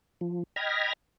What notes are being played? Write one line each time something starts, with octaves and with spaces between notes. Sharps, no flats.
F3
D#5 G5 B5 F6 G#6 A#6